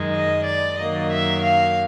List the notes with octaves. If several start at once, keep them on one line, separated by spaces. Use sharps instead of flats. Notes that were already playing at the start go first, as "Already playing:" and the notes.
Already playing: F#2 D#3 G#3
D#5
D5
F#2 D#3 F#3 A#3 D#5
E5
F5